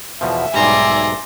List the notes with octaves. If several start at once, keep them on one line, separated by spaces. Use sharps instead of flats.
E2 B2 F3 E5
B1 G#2 G3 D5 G#5 A#5 C6